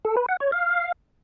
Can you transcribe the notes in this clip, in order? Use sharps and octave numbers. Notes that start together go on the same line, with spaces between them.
A4
B4
F#5
C#5
F5